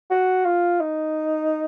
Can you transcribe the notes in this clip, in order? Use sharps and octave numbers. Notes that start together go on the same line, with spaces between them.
F#4
F4
D#4